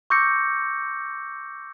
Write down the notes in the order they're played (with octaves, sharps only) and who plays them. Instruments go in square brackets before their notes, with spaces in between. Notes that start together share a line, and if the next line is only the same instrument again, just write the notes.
[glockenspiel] C#6 D6 E6 G6 A#6 C#7